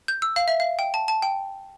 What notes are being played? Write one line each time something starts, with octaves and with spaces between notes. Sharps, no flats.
G6
E6
F5
E5
F5
G5
A5
A5
G5